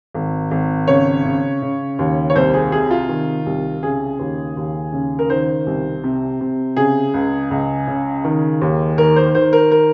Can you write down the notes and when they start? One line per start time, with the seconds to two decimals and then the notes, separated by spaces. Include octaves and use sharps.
0.15 G#1
0.51 G#1
0.88 C#3 C#5
1.25 C#3
1.62 C#3
1.99 D#2
2.30 C#5
2.35 C2 C5
2.54 G#4
2.72 C3 G#4
2.91 F4
3.09 D#3
3.46 C2
3.83 C#3 G#4
4.19 D#2
4.57 D#2
4.93 C#3
5.19 A#4
5.30 D#3 C5
5.67 C2
6.04 C3
6.41 C3
6.77 C#3 G#4
7.14 C#2
7.51 C#2
7.88 C#3
8.24 D#3
8.61 D#2
8.98 D#3 A#4
9.16 C5
9.35 D#3 C5
9.53 A#4
9.72 A#4